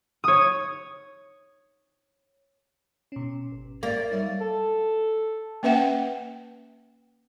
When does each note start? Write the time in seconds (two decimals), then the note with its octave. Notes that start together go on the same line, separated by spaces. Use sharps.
0.24 C#5 D#6
3.12 B2 C#4
3.52 G#1
3.83 A#3 D5
4.11 G3 D#4 C#5 E5
4.41 A4
5.63 A#3 C#4 B4 E5 F#5 G5